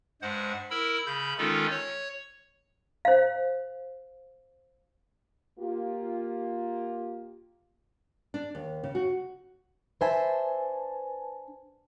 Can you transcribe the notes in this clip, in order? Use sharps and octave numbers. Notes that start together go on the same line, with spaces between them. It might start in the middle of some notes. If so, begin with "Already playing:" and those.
G2 G#3 C5 F#5
E4 A#4 B5 E6
C#3 B5 G6
D#3 G#3 C#4 D#4 F4 A4
C#5
C5 F5
A#3 F4 G4
D4
D#2
C#3
F#4
D4 B4 C5 E5 G#5 A5